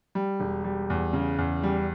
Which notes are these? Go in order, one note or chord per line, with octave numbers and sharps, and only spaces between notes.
G3
E1
G3
E2
C#3
E2
G3